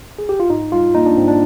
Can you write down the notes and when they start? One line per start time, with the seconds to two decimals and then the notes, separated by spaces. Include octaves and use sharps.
0.19 G#4
0.29 G4
0.40 F4
0.50 G#2 D#4
0.72 G3 F4
0.95 A#3 D#4
1.06 D4
1.17 G#2 C4
1.28 D4